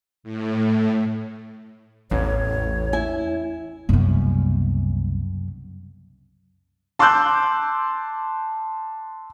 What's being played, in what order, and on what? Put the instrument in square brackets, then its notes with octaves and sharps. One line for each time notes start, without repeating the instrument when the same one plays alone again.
[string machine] A2
[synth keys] A1 [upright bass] E2 [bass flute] C#5
[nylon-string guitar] E4 G#5
[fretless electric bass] C2 A#3 B3 [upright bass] F#2 C#3
[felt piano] A5 C6 D6 E6 F#6 G6